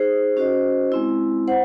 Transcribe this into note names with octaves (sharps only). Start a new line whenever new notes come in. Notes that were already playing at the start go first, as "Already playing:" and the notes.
Already playing: D#4 G#4 C5
C#4 F#4 C5 D#5
G#3 C4 E4
C5 F#5